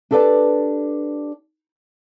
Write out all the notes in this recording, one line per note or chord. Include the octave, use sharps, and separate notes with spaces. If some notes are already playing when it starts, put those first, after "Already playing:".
D4 G4 A4 B4 D5 A5